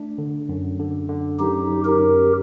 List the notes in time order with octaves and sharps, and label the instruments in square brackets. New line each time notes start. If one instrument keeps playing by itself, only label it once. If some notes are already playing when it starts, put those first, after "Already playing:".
Already playing: [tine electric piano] A3 D4
D3
F#2
D3
D3
[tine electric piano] F#2 [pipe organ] D#4 G4
[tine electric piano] F#3
[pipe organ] G4 A#4
[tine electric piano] F#2